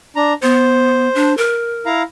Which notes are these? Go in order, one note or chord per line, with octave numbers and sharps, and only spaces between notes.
D4 A#5
B3 C5
D4
A#4
E4 F5 A#5